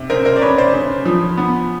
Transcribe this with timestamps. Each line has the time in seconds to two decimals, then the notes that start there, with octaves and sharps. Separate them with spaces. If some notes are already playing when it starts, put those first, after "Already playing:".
Already playing: C3
0.10 C#3 A#4 C5
0.25 A#4 C5
0.36 D5
0.41 C#3 B4 C#5
0.58 C5 D5
0.74 C#3
1.05 F3
1.37 B3